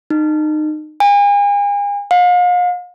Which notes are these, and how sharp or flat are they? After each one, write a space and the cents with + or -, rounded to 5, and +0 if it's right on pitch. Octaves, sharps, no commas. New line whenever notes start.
D#4 -25
G#5 -40
F5 +40